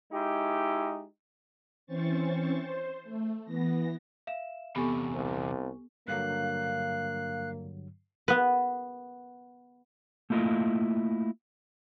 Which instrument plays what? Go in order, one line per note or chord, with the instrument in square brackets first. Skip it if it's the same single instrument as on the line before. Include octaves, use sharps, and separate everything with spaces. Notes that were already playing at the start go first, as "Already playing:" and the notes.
[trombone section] G#3 D#4 E4 G4
[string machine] E3 C4 C#4 C5 C#6 A6
C5
A3
E3 B3 A#6
[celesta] E5 F5 E7
[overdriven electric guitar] E2 C3 [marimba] B3 A4 [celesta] G4 G#5 C#6
[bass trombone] C2
[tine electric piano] G2 D3 F#3 [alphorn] A#3 [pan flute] F5 [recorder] F#6
[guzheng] B3 B4
[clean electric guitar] A3 A#3 E4 F4 D#5 F5